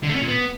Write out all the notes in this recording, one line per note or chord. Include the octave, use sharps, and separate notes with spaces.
D3
A3
C#4
A#2
B3